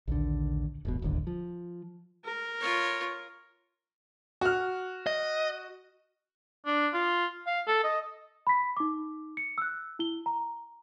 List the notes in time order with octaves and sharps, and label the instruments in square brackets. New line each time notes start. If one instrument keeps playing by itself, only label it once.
[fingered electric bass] A#1 D#2 D3
E1 A1 B2
D1 G1 D#2 D3
F3
[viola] A#4
[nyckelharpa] F4 C#5
[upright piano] F#4 F6
[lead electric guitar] D#5
[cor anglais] D4
F4
F5
A4
D#5
[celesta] B5 B6
D#4 D6
C#7
E6 F#6
E4 G7
A#5